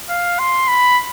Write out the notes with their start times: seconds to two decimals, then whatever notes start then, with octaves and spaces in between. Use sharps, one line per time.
0.10 F5
0.39 C6
0.68 B5